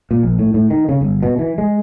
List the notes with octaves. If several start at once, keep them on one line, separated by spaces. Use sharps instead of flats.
A#2
A#1
A2
A2
D#3
C#3
G1
B2
E3
G#3